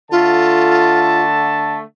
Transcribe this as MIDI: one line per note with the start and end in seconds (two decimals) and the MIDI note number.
0.11 1.81 50
0.11 1.81 57
0.11 1.22 65
0.11 1.81 81